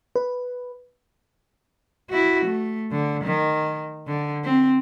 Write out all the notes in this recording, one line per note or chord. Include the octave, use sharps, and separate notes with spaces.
B4
E4 F#4
A3
D3
D#3
D3
C4